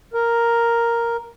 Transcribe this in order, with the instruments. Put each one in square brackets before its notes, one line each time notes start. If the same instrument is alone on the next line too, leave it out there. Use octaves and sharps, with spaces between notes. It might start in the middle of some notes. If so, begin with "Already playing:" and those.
[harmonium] A#4